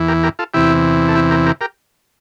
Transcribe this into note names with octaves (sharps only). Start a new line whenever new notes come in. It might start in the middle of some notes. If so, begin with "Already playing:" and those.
Already playing: E2 E3
G4 A#4
G4 A#4
F4 A4
E2 C3 E3 E4 G4
A4
E4 G4
G4 A#4
G4 A#4
G4 A#4